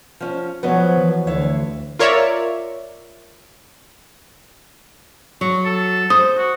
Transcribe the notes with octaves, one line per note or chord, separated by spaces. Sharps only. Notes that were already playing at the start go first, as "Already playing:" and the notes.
F3 C#4
F3 F#3 B3 B4 C#5 D#5
E3
D2 E4 C#5 F5
F4 A#4 C#5 D5 E5
F#3 C#6
A4
C5 D#6
F#4